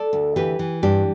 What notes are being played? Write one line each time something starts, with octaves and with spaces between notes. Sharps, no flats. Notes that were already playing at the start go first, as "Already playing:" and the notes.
Already playing: A4 D5
D2
E3 G4 B4
E3
G2 D4 G4